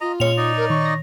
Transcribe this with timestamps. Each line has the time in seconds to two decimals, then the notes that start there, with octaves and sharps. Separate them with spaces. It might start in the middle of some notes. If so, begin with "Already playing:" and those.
0.01 F4 D#5 A#5
0.20 A#2 G#3 C#4 C#5 F7
0.37 D#4 D5 D#5
0.57 A#4
0.70 D#3 C#6
0.85 A#6